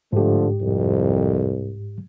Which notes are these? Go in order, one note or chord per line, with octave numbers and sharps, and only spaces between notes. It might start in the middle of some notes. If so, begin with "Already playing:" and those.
G#2 D3 F3 A3 G4
C2 F2